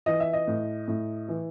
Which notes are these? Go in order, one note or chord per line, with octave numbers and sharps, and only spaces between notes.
E3 D#5
E5
D#5
A2
A2
E3